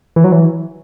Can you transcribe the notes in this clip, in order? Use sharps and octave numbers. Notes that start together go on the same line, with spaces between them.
E3
F#3
E3